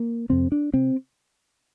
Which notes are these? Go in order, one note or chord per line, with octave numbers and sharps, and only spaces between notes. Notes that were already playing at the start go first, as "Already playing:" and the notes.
Already playing: A#3
F2 C3 C4
D4
C3 C4